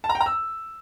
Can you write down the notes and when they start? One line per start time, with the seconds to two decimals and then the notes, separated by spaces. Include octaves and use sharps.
0.04 A5
0.09 A#5
0.15 G5
0.21 A#5
0.26 E6